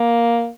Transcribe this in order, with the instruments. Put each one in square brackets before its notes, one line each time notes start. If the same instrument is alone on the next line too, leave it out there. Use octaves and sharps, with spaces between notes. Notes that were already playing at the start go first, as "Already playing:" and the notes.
Already playing: [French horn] A#3